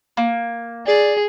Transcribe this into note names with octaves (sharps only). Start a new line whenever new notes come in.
A#3
G#4 D5